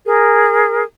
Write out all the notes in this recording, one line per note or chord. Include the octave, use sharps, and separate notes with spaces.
G#4 A#4